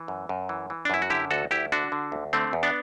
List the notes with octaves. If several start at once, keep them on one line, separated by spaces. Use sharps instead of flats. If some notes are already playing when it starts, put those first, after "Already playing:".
Already playing: E3
F#2
F#2
E3
E3
D4
F#2 E4
F#4
D3 E4 G4
D2 F#4 A4
D2 E4 G4
D3 D4 F#4
D3
D2
D3 A3 C4
E2
B3 D4